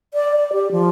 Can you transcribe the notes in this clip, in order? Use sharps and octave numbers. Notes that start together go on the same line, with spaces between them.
D5
D5
G4
F3